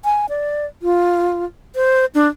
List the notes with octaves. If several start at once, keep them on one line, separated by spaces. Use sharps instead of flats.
G#5
D5
F4
C5
D4